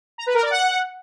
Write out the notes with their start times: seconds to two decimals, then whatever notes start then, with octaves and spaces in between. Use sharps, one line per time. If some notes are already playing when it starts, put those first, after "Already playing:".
0.18 A#5
0.26 B4
0.34 A#4
0.43 D5
0.51 F#5